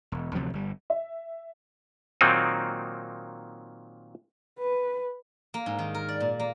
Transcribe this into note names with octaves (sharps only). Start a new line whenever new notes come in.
E1
D2 C3 F3 F#3
G1 G3
E5
A#2 D#3 F#3 A#3 C4 D#4
B4
A#3
G#2
D#3
A#4
D5
A#2
A#3